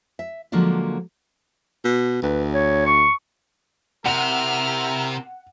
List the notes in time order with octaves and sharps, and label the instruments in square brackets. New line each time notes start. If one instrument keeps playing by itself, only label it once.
[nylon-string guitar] E5
D3 F3 F#3 G#3 A#3 D4
[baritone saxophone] B2
[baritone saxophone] D2 [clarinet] B4
[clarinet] C#5
C#6
[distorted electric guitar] C3 [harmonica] E4 A#4 [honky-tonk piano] F#5 [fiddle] F6